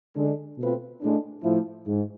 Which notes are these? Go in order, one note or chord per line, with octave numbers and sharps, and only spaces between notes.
D3 G#3 D4 A4
B2 A3 C4 F4 B4
A2 G#3 D4
A2 F3 A3 E4
G#2